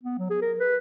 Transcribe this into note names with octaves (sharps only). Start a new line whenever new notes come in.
B3
F#3
G#4
A#4
B4